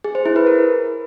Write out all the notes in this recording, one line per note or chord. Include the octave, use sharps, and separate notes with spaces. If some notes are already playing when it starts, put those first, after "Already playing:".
G#4
C5
E4
B4
A#4